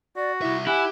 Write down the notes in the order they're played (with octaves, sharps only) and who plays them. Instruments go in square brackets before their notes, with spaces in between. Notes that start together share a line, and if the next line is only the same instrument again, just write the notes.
[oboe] F#4 [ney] D5
[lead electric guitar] C2 E5 [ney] E4
[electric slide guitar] E4 [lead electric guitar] G4 [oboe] F#5 [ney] G#5